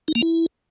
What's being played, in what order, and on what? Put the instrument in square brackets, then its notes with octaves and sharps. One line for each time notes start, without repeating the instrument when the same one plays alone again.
[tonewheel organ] D#4
A#3
E4